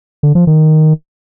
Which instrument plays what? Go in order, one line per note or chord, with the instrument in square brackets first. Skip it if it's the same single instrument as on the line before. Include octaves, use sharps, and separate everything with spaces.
[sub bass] D3
F3
D#3